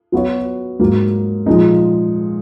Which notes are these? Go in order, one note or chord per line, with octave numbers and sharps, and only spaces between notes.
F#3 B3 F#4 C#5
G#2 F#3 A#3
A#2 F3 G#3 D#4